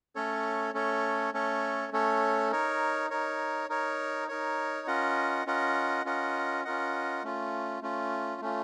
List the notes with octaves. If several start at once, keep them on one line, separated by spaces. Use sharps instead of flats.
A3 C#4 A4 C#5
A3 C#4 A4 C#5
A3 C#4 A4 C#5
A3 C#4 A4 C#5
D#4 A#4 C#5
D#4 A#4 C#5
D#4 A#4 C#5
D#4 A#4 C#5
C#4 F4 A#4 D#5 F#5
C#4 F4 A#4 D#5 F#5
C#4 F4 A#4 D#5 F#5
C#4 F4 A#4 D#5 F#5
A3 C#4 F4
A3 C#4 F4
A3 C#4 F4